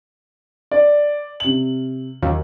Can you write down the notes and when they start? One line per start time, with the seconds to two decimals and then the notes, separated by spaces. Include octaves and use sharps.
0.71 D5
1.40 C3 F#7
2.22 D#2 F#3